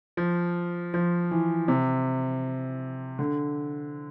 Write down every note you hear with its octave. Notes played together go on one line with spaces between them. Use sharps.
F3
F3
E3
C3
D3